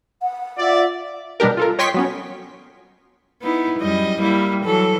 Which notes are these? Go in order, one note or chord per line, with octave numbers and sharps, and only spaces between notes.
F#5
F4 D5 E5
B2 G3 D4 G4 A#4
F4 A4 A#4
C#5 D#5 G5 C6 C#6 B6
F#3 B3 C#4
B3 D#4 E4
F#2 G3 D#5
G3 A#3 E4
E3 F#3 A4